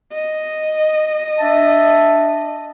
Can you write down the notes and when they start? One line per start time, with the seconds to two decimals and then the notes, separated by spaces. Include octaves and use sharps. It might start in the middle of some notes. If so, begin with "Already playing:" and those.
0.13 D#5
1.39 D4 E5 A5